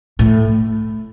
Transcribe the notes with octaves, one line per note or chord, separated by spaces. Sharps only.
A2